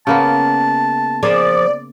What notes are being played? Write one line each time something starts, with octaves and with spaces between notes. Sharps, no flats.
C#3 A#3 B3 A5
F3 G#4 A#4 D5